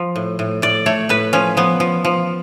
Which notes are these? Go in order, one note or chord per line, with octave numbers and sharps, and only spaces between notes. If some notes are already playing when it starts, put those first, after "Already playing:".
Already playing: F3
A2
A2
A2 D5
A3 C#5
A2 B4
F3 C#4
F3 B3
F3
F3